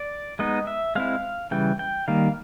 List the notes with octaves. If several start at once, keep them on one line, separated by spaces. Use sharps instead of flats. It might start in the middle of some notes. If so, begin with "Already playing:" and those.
Already playing: D5
G#3 B3 D#4 D#5
E5
G#3 C4 E4 F5
C#3 E3 G3 G5
G5
D#3 G3 A#3 F5